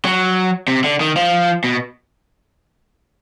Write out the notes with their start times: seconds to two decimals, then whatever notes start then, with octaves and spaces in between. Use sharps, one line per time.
0.05 F#3
0.68 C3
0.84 D3
1.00 D#3
1.16 F3
1.64 B2